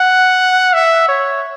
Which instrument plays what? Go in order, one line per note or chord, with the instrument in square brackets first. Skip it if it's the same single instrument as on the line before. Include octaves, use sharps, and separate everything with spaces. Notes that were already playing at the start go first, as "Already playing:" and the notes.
Already playing: [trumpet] F#5
E5
C#5